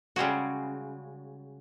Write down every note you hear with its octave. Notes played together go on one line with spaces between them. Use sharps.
C#3 G3 G#3 F#4